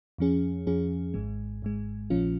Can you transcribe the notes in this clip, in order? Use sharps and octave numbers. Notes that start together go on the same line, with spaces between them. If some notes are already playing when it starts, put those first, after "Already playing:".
F2 F3 C#4 G#4
F2 F3 C#4 G#4
G#1 G#2 G#3
G#1 G#2 G#3
A#1 A#2 F3 C#4 F4